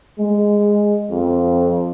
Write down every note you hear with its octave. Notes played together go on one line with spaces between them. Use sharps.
G#3
F2